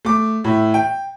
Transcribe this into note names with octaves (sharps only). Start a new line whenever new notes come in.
A3 D6
A2 E5
G5